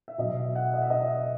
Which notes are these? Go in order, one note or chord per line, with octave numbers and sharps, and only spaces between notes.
E5
B2 F#3 D#5
E5
F#5
D#5
E5
D#5